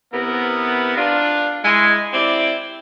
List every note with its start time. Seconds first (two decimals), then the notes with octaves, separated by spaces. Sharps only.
0.14 C3 B3 E4 A#4
0.97 D4 F4
1.64 G#3 E4
2.14 C4 E4 G4 D5